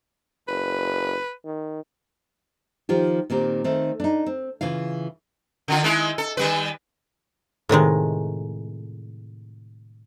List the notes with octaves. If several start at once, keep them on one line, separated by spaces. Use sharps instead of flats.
F#1 B4
D#3
D#3 F3 F4 G4
A#2 D#3 C4 G4
D#3 A3 C4
D4 D#4
C4
C#3 E3 F4 F5
D3 D#3 F4
D#3 G#3 E4
A4
D#3 G3 B4
A2 C3 D#3 G#3